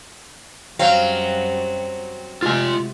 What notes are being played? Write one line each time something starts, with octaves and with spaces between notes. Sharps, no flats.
F#2 F#3 G3 C4 F#4 F5
C3 G#3 A3 F4 G#5